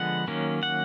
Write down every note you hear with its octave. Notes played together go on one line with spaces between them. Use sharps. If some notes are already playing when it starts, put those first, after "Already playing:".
Already playing: D3 F3 G#3 B3 F#5
D#3 F#3 A#3 C#4
F#5